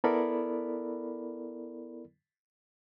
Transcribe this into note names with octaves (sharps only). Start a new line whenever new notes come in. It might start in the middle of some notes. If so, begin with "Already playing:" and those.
B3 E4 A4 A#4 D5 B5